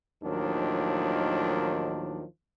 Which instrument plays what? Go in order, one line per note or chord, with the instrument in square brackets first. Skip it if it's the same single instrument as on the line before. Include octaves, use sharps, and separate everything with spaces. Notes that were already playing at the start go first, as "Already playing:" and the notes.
[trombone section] D#2 A2 D#3 F3 F#3 D4